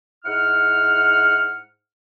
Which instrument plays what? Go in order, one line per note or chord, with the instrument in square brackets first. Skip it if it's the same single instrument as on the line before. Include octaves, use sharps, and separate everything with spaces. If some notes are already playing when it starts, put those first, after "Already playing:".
[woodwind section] G#2 E4 F#5 F6